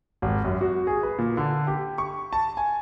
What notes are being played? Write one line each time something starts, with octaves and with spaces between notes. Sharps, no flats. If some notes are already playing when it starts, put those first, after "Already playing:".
G#1
F#2
F#4
G#4
B4
A#2
D3
G4
C#6
A5
G#5